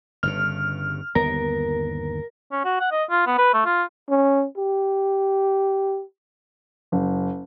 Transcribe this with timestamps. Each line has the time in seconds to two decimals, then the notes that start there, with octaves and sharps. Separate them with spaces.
0.23 G1 G2 C#3 F6
1.15 G1 D#2 B3 A#4
2.52 C#4
2.65 F#4
2.80 F#5
2.92 D#5
3.10 F4
3.26 B3
3.38 B4
3.54 A3
3.66 F4
4.10 C#4
4.57 G4
6.92 F#1